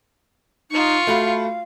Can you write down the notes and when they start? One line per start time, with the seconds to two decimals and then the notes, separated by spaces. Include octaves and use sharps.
0.71 D#4 F4 C#6
1.07 A3 F#4 F5 B5